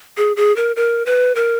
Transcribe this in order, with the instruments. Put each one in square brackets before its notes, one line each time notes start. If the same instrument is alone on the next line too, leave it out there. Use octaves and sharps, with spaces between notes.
[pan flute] G#4
G#4
A#4
A#4
B4
A#4